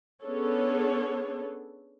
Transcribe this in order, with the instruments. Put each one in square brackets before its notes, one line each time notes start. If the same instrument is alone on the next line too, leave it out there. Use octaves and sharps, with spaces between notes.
[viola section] B3 C#4 D4 G#4 A4 C#5